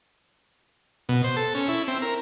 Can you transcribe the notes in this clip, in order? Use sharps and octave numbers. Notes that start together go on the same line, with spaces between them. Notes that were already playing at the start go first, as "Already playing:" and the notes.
B2
C5
A4
C#4
E4
C4
A#4